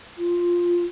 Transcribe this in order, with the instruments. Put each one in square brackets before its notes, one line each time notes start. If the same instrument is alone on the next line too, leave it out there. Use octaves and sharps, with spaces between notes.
[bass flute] F4